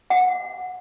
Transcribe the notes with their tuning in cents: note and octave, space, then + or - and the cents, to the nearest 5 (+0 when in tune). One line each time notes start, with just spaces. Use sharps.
F#5 -20